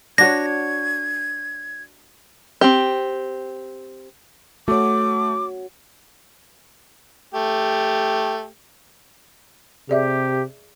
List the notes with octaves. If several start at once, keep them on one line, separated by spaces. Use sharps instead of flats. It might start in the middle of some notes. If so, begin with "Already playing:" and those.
D4 F#4 C#5 G#6 A#6
C4 G4
A3 F#4 C#5 D6
A3 G4
C3 G4 G#4 D5 E5